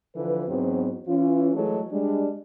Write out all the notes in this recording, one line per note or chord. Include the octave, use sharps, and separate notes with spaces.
D3 E3 F3 A4 B4
E2 G#2 F#3 B3 C4
E3 C#4 F4
E3 F#3 G#3 A3 G#4 A4
G3 G#3 D4